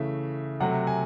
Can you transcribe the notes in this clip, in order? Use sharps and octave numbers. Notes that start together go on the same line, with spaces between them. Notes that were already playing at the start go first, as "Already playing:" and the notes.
Already playing: C#3 E3 A3 E5
C3 F#3 A3 F#5
G#5